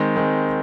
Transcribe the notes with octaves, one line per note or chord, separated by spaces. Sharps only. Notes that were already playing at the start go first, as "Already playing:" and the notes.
Already playing: D#3 G#3 C4
D#3 G#3 C4